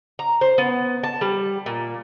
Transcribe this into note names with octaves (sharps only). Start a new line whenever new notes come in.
A#5
C5
B3
A5
G3
A#2